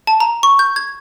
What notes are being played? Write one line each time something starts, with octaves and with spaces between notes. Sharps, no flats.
A5
A#5
C#6
G6
G#6